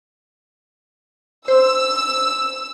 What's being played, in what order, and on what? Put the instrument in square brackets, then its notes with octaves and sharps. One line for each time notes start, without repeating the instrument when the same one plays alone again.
[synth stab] C5 [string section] E6